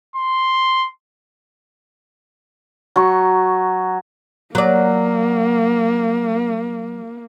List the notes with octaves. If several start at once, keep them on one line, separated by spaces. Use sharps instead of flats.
C6
F#3 C#6
F#3 A#3 D5